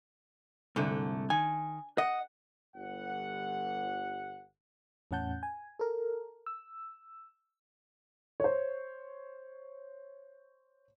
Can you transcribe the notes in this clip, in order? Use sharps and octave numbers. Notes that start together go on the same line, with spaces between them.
C2 G#2 D3 A3
D#3 G#5
D#5 F#5
G1 F#5
E2 A2 C#4 F#5 A5 G6
G#5
A4 A#4
E6
C5 C#5